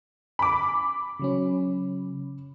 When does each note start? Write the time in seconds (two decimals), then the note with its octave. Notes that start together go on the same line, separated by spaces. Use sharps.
0.39 B5 D6
1.20 C#3 F#3 C#4